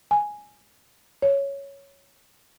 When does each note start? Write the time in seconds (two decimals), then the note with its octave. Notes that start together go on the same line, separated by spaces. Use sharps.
0.11 G#5
1.22 C#5